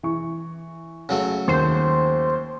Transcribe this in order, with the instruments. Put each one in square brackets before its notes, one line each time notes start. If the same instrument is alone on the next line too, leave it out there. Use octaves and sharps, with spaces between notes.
[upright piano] E3 C#6
[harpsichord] C#3 F#3 A3
[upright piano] D#2 [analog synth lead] C5